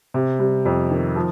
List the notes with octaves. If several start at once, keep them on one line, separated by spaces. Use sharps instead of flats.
C3
G3
F2
D#3
F3